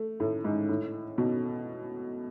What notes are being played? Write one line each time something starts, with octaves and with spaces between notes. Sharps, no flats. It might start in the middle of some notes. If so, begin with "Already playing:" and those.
Already playing: A3
A2
G#2
A2
B2